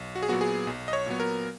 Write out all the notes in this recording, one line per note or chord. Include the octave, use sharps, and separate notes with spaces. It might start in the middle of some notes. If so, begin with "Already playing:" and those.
Already playing: B1
F#4
G#4
A#2 F#3 B3 F#4
G#4
B1
D#5
C#5
A#2 F#3 B3
A#4